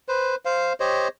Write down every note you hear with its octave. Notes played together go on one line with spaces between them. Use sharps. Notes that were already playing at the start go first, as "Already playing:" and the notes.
B4 C5
C5 F5
G4 C5 C#5 D#5